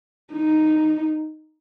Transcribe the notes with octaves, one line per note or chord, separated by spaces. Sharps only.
D#4